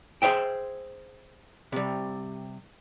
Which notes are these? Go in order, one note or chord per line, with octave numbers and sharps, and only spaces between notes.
G#4 B4 C5 E5 G5
C3 G3